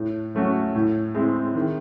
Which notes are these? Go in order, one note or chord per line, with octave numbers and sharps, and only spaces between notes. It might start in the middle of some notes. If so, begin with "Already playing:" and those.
Already playing: A2
F#3 A3 C#4 F#4
A2
G#3 C4 E4
D#3